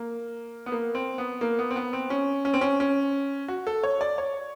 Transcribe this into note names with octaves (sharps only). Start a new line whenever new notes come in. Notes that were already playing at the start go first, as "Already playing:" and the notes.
Already playing: A#3
B3
A#3
C4
B3
A#3
B3
C4
B3
C4
C#4
C#4
C4
C#4
C#4
F#4
A4
C#5
D5
C#5